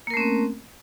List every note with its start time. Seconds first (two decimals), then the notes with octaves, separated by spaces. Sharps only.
0.07 A#3
0.10 A#4
0.14 A3
0.17 C#4
0.20 C4